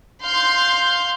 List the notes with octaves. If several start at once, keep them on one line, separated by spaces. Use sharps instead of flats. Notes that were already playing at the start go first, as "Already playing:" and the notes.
F5 C6 G6